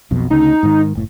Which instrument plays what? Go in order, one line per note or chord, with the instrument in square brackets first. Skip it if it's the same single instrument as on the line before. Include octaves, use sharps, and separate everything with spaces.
[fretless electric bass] B1 F2 B2
[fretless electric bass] D2 C#3 [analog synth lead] D#4
[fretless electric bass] G#2 D#3
F#1 A2